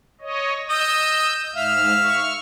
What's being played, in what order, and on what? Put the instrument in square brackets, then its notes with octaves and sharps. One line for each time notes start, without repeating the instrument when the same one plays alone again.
[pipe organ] C#5 D#5
[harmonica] D#5 [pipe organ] E6 G6
[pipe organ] G#2 F6 [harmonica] E5 F5
[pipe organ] C#6 F6